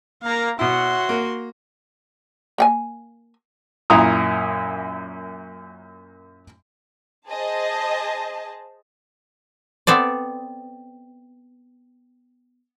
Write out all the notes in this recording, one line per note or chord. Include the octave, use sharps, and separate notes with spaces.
A#3 F5 A#5
B2 E4 F#4 C#5 E5 F#5 C6
A#3
A#3 G5 G#5
F#2 A#2 E4 A#5 D#6
G#4 C5 D#5 A5
B3 C4 A4 D5